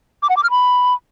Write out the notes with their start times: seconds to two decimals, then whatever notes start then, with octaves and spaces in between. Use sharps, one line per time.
0.23 D6
0.30 F#5
0.37 D6
0.44 F6
0.51 B5